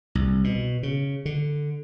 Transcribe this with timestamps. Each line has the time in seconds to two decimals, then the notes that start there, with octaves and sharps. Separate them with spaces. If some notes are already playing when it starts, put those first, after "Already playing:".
0.15 C2
0.44 B2
0.83 C#3
1.25 D3